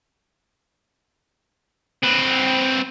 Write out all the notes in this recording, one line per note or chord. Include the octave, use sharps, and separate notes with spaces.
C4 B4